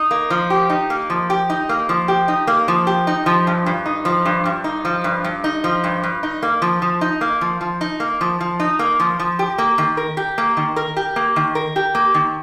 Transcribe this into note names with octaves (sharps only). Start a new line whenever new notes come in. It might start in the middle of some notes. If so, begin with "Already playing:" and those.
Already playing: D#4
A#3
F3
G4
D#4
A#3
F3
G4
D#4
A#3
F3
G4
D#4
A#3
F3
G4
D#4
F3
G2
G2
D#4
F3
G2
G2
D#4
F3
G2
G2
D#4
F3
G2
G2
D#4
A#3
F3
F3
D#4
A#3
F3
F3
D#4
A#3
F3
F3
D#4
A#3
F3
F3
G4
A#3
D#3
A#4
G4
A#3
D#3
A#4
G4
A#3
D#3
A#4
G4
A#3
D#3